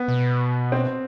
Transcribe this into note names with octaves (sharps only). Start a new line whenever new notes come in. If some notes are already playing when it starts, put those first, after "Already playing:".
Already playing: B3
B2
C4